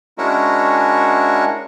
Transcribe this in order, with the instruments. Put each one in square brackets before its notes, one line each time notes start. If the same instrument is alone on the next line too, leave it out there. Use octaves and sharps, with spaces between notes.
[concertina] G#3 C#4 D4 E4 F#4 A#4